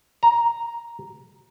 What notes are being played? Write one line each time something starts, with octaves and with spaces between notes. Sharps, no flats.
A#5